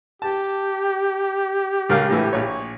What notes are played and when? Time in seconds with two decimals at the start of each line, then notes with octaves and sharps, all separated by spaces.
0.22 G4 A5
1.89 C#2 A#4 F5
2.10 A2 E3 E4
2.33 A#1 C#5